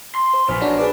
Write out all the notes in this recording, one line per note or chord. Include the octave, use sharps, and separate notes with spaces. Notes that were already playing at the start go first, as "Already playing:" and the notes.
C6
C5
A#1 F#2 B3 C5 F6
D4 F#4 C#5
D4 G#4 B4 D5